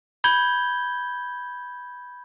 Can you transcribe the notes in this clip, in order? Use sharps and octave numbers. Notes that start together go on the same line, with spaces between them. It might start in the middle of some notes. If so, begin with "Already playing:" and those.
B5 G6 G#6 G7